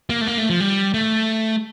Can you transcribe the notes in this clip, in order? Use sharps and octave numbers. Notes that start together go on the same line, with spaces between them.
A#3
A3
A#3
A3
F3
G3
A3